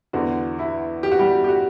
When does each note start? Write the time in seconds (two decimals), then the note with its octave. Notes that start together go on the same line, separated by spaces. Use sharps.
0.13 E2 D3 F#4
0.59 E4
1.03 G4
1.12 F#4
1.19 G3 G4
1.44 G4
1.49 F#4